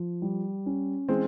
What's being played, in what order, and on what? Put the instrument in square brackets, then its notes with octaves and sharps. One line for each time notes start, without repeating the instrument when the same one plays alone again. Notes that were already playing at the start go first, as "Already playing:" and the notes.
Already playing: [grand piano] F3
G3
C#4
[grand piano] E3 [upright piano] G#3 C4